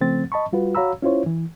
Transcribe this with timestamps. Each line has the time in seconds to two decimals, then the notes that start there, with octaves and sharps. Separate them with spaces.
0.01 C#3 F3 A3 C4 A6
0.32 D#5 A5 B5 C#6
0.53 G3 F4 F#4 B4
0.75 F#4 C#5 F5 A#5 B5 E6
1.02 C#4 E4 F4 C5 C#5
1.26 E3